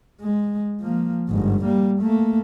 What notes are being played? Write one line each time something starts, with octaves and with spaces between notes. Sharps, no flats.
G#3
F3 A#3
G1 G#2
G3 A#3
A3 A#3